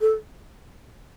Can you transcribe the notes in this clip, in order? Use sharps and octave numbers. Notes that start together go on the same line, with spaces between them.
A4